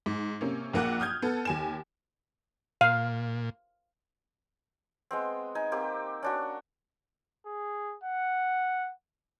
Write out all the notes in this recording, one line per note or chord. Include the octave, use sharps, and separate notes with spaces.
G#2
C3 A#3 C#4
A#1 A#3 F#5 F#6
D#6 F6 G6 G#6
B3 A4
D#2 G#5 E7
A#2 F5
G#3 B3 C4
D#4 G#5
A#3 C4 G4
C#4 D4 F#4
G#4
F#5